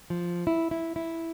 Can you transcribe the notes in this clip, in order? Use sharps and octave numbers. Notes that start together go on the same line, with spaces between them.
F3
E4
E4
E4